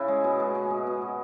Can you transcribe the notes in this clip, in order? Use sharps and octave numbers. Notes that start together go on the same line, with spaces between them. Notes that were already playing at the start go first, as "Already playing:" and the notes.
Already playing: C#3 E4
G#3
B2
G#3
G#3
B2
B2
B2